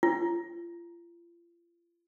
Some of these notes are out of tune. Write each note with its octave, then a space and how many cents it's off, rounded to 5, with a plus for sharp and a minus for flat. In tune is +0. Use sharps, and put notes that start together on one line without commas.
F4 -35